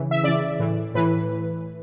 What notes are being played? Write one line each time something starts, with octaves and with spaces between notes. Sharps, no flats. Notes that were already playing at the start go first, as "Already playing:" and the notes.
Already playing: C#3 E3
E5
C#3 E3 D5
A2 E3
A2 E3 B4